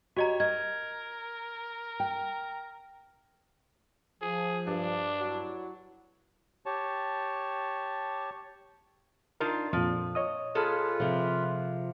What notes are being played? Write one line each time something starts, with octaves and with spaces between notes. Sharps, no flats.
F#4 G4 C#5 D#5 A#5
A#4 D#5 G#6
G5
F3 G#4
G2 D4
F#3 E4
G4 C#5 A5
D4 D#4 F4 A#4
F2 A#2 F3
C#5 D#5 D#6
A#2 F4 G#4 A4 B4
C3 F3